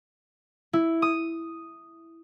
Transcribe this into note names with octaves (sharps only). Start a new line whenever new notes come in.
E4
D#6